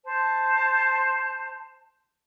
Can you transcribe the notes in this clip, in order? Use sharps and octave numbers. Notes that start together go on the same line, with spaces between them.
C5 A5